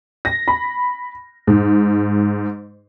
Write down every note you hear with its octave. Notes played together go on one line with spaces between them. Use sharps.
A#6
B5
G#2